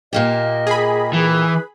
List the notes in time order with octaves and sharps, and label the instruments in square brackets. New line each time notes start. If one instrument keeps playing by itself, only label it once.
[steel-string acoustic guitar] A#2 A#3 G4 [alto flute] D#5
[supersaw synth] G#4 B5
[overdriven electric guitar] E3 [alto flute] B4